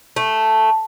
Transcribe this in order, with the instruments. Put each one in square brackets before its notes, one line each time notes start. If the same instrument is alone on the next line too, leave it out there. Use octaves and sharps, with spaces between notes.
[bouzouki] A3